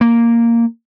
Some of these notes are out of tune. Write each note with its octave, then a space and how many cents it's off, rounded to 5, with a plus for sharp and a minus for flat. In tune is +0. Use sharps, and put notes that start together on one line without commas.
A#3 -5